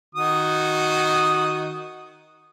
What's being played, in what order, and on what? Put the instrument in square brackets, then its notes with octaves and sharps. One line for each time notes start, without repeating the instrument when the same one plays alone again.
[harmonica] D#3 F#4 D#6